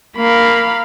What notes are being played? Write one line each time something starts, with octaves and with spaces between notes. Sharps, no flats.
A#3 F5 B5